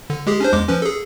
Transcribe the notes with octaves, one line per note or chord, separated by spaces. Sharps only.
D3
G#3 G4 G#4
C#4 D4 C5
E2 G#3 D6
F3 C#4 B4
G#4 A4